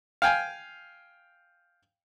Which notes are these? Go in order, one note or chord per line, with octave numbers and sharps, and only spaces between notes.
F5 G5 G#5